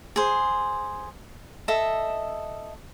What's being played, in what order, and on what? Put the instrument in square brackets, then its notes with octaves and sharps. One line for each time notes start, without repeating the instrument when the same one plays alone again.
[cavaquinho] G#4 C5
A4 D#5 E5